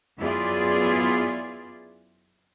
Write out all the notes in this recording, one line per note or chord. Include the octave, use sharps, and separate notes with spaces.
F#2 B3 E4 F4 G#4 D5